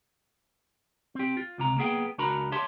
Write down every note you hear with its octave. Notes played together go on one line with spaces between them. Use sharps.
C4 G4
F4
C#2 C3 A#5
A#3 B3 G#4 F5 G5
C#2 D4 F#4 A#4 A#5 B5
G4 C#5 E5 A5 C6